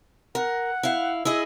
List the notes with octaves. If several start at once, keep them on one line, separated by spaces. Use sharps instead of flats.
A#4 F#5
E4 F5
E4 G#4 D#5 E6